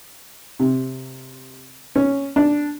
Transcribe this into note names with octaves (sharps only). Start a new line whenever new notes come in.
C3
C#4
D4